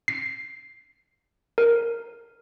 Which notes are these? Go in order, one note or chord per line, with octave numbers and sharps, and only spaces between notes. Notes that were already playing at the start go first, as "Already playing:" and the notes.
C7
A#4